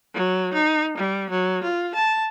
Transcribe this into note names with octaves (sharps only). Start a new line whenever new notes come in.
F#3
D#4
G3
F#3
F4
A5